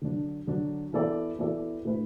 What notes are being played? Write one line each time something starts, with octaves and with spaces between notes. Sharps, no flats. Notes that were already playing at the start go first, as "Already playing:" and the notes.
D3 F#3 D4
D3 F#3 D4
E3 B3 F#4 A4 D5
E3 B3 F#4 A4 D5
A2 A3 D4 B4